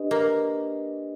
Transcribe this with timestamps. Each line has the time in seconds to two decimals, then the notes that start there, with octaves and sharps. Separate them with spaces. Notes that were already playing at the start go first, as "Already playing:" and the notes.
Already playing: D4 G4 B4 D#5
0.11 A#3